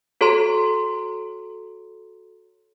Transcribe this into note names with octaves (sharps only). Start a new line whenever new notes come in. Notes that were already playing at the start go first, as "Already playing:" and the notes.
F#4 A4 C#5 A#5 C6